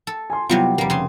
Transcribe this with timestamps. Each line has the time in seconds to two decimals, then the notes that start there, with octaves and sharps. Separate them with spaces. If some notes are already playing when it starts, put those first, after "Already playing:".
0.07 A4
0.30 G#5 C6
0.49 C3 F#3 G3 B3 E4 F4
0.78 F1 G3 A#3
0.90 C#3 C6